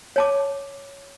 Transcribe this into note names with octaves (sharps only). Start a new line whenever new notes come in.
C#5 A5 D6